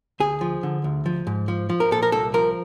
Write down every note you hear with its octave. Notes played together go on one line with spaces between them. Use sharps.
D2 G#4
F3
D3
D2
F3
G#2
F3
F3
A#4
A#2 A4
A#4
C2 A4
F3 A#4